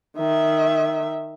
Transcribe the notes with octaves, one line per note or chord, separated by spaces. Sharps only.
D#3 E5